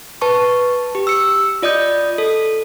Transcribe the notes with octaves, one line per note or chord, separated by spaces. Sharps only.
B4 A5 C#6
G4
E6 C#7
F4 D5 D#5 D#6 G6
A4